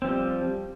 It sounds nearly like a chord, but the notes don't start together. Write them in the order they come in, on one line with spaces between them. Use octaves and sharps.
C4 F3 G3